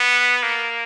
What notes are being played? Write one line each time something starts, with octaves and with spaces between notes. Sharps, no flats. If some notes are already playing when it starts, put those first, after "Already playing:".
Already playing: B3
A#3